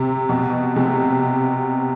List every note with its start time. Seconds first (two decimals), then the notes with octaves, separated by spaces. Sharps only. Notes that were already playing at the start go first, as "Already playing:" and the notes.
Already playing: C3
0.29 B2
0.76 C3